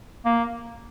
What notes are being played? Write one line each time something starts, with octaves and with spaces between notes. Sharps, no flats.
A#3